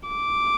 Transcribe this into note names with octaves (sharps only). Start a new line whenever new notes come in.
D6